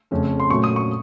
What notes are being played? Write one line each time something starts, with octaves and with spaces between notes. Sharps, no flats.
F2 C#3 A3 C#4
C6
A#2 F#3 A3 C#4 C#6
D#6
C#6